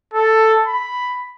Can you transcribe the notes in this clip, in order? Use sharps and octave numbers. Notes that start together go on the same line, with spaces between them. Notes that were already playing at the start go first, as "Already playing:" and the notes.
A4
B5